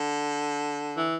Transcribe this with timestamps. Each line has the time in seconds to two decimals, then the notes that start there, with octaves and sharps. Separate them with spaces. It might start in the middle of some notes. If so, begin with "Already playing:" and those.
Already playing: D3
0.97 E3